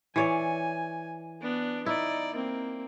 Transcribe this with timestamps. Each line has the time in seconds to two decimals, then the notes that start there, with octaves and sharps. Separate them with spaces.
0.16 E3 C#5 D5 G#5
1.41 B3 D4
1.86 D#4 E4 D5
2.34 A#3 C4